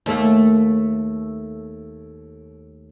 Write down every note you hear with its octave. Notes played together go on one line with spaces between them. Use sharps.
D#2 A3 A#3